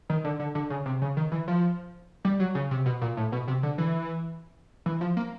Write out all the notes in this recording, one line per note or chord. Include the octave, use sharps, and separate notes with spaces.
D#3
D3
D3
D3
C#3
C3
C#3
D#3
E3
F3
G3
F#3
C#3
C3
B2
A#2
A2
B2
C3
D3
E3
E3
F3
A#3